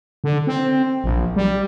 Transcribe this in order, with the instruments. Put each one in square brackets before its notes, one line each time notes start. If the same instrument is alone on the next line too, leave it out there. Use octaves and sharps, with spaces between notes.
[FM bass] D3
C4
A#1
G3